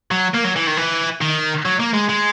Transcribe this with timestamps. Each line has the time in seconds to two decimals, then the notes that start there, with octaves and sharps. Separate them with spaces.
0.11 F#3
0.34 A#3
0.44 F#3
0.56 E3
0.67 D#3
0.77 E3
1.21 D#3
1.66 F#3
1.80 A#3
1.94 G#3
2.09 G#3